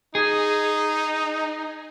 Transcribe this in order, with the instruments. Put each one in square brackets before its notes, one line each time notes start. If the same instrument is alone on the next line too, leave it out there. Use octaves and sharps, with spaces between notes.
[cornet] D#4 [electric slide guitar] G#4